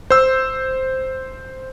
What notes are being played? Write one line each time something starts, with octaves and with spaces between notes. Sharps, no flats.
C5 E6